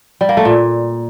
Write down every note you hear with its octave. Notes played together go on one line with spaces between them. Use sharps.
G3
A#3
A3
A#2